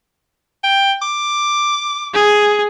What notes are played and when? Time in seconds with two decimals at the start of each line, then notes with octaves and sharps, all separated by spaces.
0.64 G5
1.02 D6
2.14 G#4